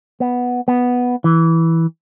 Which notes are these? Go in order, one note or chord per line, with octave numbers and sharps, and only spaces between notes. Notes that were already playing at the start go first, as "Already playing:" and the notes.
B3
B3
E3